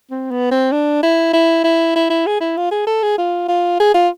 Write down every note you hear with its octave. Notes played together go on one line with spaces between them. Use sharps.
C4
B3
C4
D4
E4
E4
E4
E4
E4
G#4
E4
F4
G#4
A4
G#4
F4
F4
G#4
F4